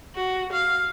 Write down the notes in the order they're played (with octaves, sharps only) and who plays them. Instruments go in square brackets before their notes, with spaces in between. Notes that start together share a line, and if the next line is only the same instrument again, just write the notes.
[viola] F#4
F5